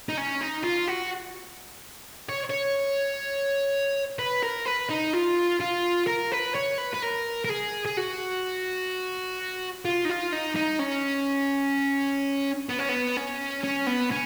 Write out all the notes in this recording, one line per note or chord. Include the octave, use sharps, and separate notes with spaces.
D#4
C#4
D#4
F4
F#4
C#5
C#5
B4
A#4
B4
D#4
F4
F4
A#4
B4
C#5
B4
B4
A#4
A#4
G#4
G#4
F#4
F4
D#4
F4
D#4
D#4
C#4
B3
C#4
B3
C#4
C#4
B3
C#4